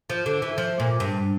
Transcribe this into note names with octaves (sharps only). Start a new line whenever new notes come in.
F3
D3
E3
F3
A#2
G2